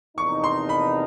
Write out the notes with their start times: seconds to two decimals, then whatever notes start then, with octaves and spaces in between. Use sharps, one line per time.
0.17 E2 C3 F3 A#3 D#4 C#6
0.44 C6
0.69 B5